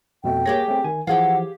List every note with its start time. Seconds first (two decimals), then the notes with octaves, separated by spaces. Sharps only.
0.24 F2 B2 A3 G5
0.46 A#3 G4 G#4 C#5 A#6
0.68 A3 C4
0.84 D#3 G#5
1.07 E3 F3 G4 G#4 F5 F#5